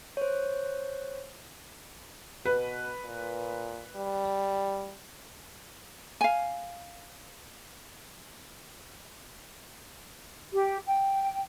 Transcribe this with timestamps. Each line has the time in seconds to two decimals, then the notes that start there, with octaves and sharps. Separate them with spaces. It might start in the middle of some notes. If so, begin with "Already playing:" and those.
0.17 C5 C#5
2.45 B2 B4
3.05 A#2
3.96 G3
6.21 F5 G#5
10.52 G4
10.85 G5